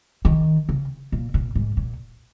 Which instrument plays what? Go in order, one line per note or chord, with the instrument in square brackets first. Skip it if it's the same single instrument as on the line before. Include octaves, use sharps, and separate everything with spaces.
[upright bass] D#3
C#3
A#2
A#2
G#2
A#2